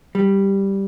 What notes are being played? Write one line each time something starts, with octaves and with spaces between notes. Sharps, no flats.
G3